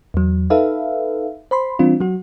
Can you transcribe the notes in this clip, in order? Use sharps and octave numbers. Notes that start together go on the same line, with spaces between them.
E2 F#3
D#4 A4 B4 E5 F5
C5 B5 C6
E3 G3 C4 D4 F4
F#3 F#4